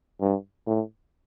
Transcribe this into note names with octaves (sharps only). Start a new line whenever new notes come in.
G2
A2